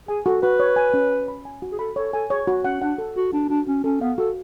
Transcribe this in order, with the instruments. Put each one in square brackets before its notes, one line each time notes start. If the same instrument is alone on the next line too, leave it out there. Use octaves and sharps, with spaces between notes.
[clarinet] G#4 [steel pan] G#5
[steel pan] F#4 [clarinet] A4
[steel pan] F#4 [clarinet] B4
[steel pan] C#5
G#5
C#4
G#5
B5
G#5
F#4
[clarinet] G#4
[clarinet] A4 [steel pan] B5
[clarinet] A4 [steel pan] C#5
[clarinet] A4 [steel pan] G#5
[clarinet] G#4 [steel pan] C#5
[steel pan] F#4
[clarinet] C#4 [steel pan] F#5
[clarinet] D4 [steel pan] F#5
[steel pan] A4
[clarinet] F#4 [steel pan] A4
[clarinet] D4 [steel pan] F#4
[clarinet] D4 [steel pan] F#4
[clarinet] C#4 [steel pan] F#4
[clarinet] C#4 [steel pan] A4
[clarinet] B3 [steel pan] F5
[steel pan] F#4 [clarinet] A4